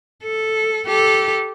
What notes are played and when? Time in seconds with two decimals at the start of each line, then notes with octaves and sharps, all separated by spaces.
0.23 A4
0.87 G4 A4